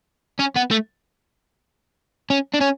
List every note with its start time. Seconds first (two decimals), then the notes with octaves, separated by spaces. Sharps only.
0.39 C#4
0.56 B3
0.71 A3
2.30 C#4
2.54 D4
2.61 C#4